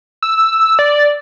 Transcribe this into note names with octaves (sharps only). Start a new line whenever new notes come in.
E6
D5